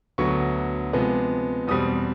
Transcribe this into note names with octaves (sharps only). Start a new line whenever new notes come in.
D2 D3 F#3 B3 C#6
C3 F3 G#3 B3
E2 B2 G3 C4 D#6